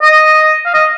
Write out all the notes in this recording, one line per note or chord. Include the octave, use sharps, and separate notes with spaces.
D#5
F5
D#5